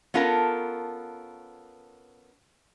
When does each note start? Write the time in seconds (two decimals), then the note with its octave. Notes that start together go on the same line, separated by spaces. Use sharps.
0.14 B3 C#4 F4 A4 A#4